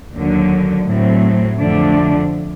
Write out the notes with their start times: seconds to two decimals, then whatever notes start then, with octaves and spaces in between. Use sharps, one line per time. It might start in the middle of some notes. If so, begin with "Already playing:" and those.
0.15 D#2 D3 F#3
0.87 A2 F#3 A3 C4
1.59 F2 D3 F3 A3 D4